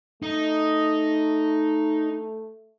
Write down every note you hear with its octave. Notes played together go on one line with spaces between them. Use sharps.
A3 D#4